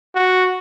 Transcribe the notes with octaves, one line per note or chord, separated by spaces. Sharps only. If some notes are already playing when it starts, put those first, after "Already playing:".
F#4